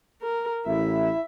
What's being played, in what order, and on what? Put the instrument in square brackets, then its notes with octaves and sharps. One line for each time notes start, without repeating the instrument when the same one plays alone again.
[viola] A#4
[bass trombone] A1 [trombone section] E4 [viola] E5